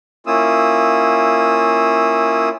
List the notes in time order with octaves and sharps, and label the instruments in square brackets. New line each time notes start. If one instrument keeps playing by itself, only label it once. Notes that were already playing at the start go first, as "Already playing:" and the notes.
[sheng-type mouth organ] A#3 C#4 E4 F4 D#6 E6